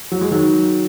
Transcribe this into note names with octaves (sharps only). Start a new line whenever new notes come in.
F#3
G#3
D#3 F#3